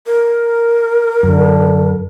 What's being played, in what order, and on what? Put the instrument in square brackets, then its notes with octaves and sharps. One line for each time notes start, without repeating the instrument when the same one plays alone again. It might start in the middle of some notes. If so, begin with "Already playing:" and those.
[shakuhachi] A#4
[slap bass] F#2 [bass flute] D3